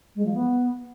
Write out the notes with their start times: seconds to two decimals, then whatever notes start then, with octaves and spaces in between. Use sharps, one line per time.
0.15 G#3
0.24 F3
0.34 B3